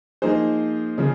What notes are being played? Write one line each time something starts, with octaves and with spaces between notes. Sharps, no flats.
F3 A#3 D#4 G#4 C5
C#3 F3